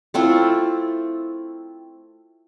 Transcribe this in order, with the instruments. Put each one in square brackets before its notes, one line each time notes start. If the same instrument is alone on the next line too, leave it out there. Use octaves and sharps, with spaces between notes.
[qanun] A3 C4 E4 F4